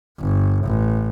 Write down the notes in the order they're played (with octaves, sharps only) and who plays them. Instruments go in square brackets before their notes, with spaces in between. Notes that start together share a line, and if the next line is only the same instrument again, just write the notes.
[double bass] G1
A1